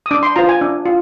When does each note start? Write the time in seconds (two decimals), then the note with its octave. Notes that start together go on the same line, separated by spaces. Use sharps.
0.06 D#6
0.11 D4 D6
0.23 C6
0.36 F4 C5 A#5
0.49 G#5
0.61 D4
0.86 F4